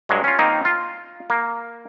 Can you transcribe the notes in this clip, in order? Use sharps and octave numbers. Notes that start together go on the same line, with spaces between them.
G2 F#3 G#3
C#4 F4
D#3 A#3 C4 D#4
F4
A#3